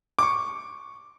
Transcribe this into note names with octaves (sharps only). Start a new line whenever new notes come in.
C#6 D6